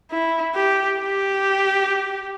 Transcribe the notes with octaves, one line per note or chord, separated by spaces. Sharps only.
E4
G4
G4